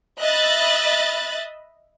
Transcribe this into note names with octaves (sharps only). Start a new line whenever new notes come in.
D#5 E5 B5 F#6 A6